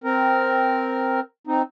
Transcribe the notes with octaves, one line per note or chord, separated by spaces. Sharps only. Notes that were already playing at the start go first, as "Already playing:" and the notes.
C4 A#4
C4 D#4